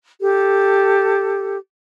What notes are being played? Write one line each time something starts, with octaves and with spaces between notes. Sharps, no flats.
G4 A4